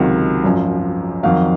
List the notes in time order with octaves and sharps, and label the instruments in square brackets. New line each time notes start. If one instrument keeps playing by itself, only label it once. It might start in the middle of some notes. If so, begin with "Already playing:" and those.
Already playing: [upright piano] C#2 C3 D#3 F#3
G#1 F#2 F3
F2 D#3 F#3 F5